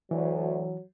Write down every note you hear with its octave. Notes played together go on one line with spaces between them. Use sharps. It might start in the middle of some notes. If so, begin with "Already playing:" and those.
D2 E3 F#3